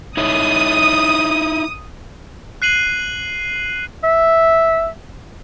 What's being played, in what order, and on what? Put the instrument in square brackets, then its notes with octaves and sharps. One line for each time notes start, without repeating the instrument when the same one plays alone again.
[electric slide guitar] D#4 E4 C#5 [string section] D#6
[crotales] F#6 C7 D#7 F#7
[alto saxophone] E5